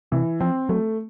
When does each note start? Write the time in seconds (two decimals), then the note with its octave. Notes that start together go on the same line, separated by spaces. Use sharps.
0.12 C3 E3
0.40 F3 C4
0.69 F#3 A3